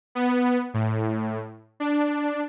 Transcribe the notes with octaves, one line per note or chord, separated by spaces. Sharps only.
B3
A2
D4